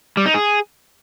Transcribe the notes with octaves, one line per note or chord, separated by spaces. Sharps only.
G3
D#4
G#4